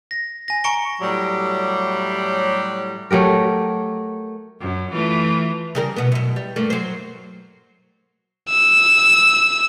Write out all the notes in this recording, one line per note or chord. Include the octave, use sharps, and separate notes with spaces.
A#6
G#5 A#6
G#5 A#5 C#6 C#7 D7 G7
A2 F#3 G3
F#3 A3 G4 A#4
F#2
E3 A3 F4
C#3 G3 A#4
B2 B3
F#2 B2
G3
G2 A3 A#3
F#3 C5
E6